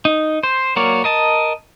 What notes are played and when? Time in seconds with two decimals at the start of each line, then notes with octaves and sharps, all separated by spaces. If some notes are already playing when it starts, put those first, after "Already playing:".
0.05 D#4
0.43 C5
0.76 F#3 A#3 A#4 C#5 D5
1.04 A#4 D#5 A5